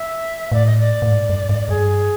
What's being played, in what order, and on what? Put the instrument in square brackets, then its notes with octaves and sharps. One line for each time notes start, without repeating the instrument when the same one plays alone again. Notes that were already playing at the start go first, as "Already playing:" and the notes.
Already playing: [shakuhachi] E5
[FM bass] A2 [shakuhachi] D5
[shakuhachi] D#5
D5
[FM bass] A2
G#2
G2
G#2
[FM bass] G2 [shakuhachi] G#4